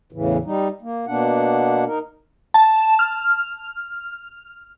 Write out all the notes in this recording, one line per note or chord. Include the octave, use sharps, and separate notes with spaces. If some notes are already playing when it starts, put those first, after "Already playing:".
E2 A2 C#3 E3
G3 D#4
A#3
B2 A#3 B3 D4 F#5
D#4 A#4
A5
F6